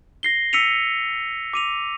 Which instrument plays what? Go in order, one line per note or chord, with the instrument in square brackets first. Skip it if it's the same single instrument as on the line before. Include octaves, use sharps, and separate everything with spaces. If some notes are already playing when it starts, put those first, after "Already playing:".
[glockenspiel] A#6 C7 G7
E6 B6 C#7 D#7 F7
D6 D#7 F7